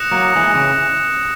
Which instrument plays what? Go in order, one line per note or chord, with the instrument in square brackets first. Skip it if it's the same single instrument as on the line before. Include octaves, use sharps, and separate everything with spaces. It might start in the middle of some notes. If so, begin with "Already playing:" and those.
Already playing: [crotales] D#6 F#6 A#6 C#7 E7
[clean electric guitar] F#3 A#3
E3 G#3
C#3 E3